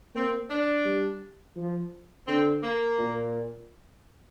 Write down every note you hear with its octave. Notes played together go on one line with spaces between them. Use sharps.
A#3 C4
D4
G3
F3
D3 C4
A#3
A#2